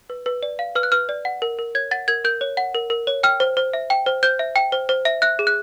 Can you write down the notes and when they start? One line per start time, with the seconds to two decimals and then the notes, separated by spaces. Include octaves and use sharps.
0.10 B4
0.26 B4
0.43 D5
0.59 F5
0.75 B4 F6
0.83 F#6
0.92 B4 F6
1.09 D5
1.25 F#5
1.42 A#4
1.59 A#4
1.75 C#5 G#6
1.91 F#5 A6
2.08 A#4 G#6
2.24 A#4 G6
2.41 C#5
2.57 F#5
2.75 A#4
2.90 A#4
3.07 C#5
3.23 G5 F6
3.40 C5
3.57 C5
3.73 E5
3.90 G5
4.06 C5
4.23 C5 G6
4.39 E5
4.56 G5
4.72 C5
4.89 C5
5.05 E5
5.22 E5 F#6
5.39 G#4
5.47 F#6